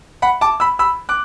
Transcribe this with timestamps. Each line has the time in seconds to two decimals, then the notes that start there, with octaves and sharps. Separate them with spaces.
0.22 F#5 B5
0.41 A5 D6
0.60 B5 E6
0.79 B5 E6
1.09 D6 F#6